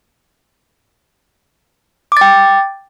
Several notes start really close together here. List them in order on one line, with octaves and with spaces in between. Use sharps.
D6 A6 G5